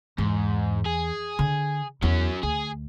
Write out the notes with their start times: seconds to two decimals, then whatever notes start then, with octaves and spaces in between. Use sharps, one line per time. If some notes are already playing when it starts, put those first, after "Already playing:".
0.18 E2 G#2
0.86 G#4
1.39 D3
2.02 E2 F#3 C#4 E4
2.43 D2 G#4